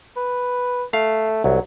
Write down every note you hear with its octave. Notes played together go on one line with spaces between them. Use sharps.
B4
A3 F5
C2 F#3